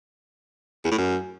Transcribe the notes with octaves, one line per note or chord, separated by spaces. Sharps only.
E2
A2
F#2